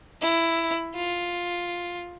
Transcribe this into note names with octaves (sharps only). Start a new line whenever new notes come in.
E4
F4